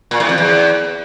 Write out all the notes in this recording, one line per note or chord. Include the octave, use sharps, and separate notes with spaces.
A#2
A2
F2
E2